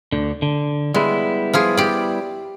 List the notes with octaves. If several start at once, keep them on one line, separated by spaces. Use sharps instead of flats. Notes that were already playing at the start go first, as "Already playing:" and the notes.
D2 D3
D3
G3 G#3 B3 E4
F3 F4 G#4
G4 D5